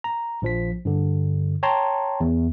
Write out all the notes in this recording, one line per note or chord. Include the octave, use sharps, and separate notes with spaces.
A#5
A#1 F3 B6
G2 D3
C#5 G5 A5 A#5 C6
E2